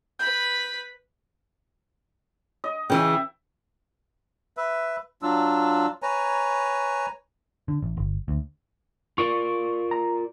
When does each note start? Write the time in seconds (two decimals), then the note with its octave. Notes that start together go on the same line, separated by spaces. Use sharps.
0.19 B4 B5 G6
2.64 D#5
2.90 C#3 E3 E5 G5
4.57 B4 E5
5.22 F#3 D4 F4 E6
6.03 B4 C#5 G#5 A#5
7.68 D3
7.82 A1
7.97 G1
8.28 D2
9.18 F4 A#4 D5 C#6
9.91 A#5